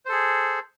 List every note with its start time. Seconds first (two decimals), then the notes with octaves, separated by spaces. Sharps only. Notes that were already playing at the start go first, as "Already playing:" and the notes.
0.06 C5
0.09 A4
0.12 G#4